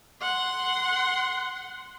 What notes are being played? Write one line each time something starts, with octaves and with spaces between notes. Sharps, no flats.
F#5 C6